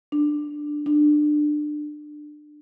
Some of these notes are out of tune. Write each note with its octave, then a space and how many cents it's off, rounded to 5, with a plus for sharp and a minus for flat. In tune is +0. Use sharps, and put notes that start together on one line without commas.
D4 +10
D4 +25